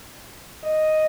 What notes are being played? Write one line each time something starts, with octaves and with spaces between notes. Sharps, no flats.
D#5